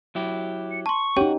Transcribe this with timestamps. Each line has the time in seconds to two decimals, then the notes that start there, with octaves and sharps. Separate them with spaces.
0.15 F#3 E4 G4
0.71 C#7
0.86 A5 C6 C#6
1.17 C#4 D#4 F#4 G4 C#5 G5